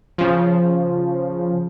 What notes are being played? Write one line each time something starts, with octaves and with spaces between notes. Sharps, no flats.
C#3 F3